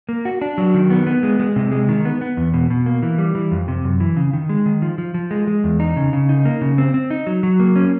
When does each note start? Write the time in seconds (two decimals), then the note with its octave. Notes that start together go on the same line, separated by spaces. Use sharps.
0.09 A#3
0.25 F#4
0.42 D4
0.58 F#3
0.74 D#3
0.90 B3
1.07 B3
1.23 G#3
1.40 G#3
1.56 C3
1.72 G#3
1.89 D#3
2.05 B3
2.21 B3
2.37 E2
2.54 B2
2.70 B2
2.86 A#3
3.02 E3
3.18 G3
3.35 E3
3.51 F2
3.68 C3
3.84 F#2
4.00 E3
4.17 C#3
4.33 D#3
4.49 G#3
4.66 D#3
4.82 F3
4.98 F3
5.14 F3
5.31 G#3
5.47 G#3
5.64 E2
5.80 D#4
5.97 C#3
6.13 C#3
6.29 D#4
6.45 A#3
6.61 C#3
6.78 C4
6.94 C4
7.10 D#4
7.27 F#3
7.43 F#3
7.60 A#3
7.76 C#4